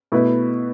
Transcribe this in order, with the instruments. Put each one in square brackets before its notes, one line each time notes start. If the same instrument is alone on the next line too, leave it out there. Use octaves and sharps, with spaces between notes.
[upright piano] B2 A3 E4 B4